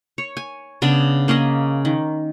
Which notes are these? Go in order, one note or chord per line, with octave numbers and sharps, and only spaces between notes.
C#5
G#5
C#3 B3 D4
A#3 C#4 G#4 D#5
D#3